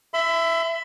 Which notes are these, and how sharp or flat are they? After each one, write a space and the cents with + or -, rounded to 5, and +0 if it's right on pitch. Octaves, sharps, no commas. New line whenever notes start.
E5 +10 B5 +45